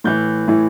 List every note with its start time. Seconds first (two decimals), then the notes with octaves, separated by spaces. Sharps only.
0.04 A2 E3 G6
0.48 A2 E3